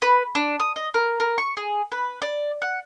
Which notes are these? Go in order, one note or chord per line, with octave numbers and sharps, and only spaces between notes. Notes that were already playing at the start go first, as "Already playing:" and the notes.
B4
D4
D#6
D#5
A#4
A#4
C#6
G#4
B4
D5
F#5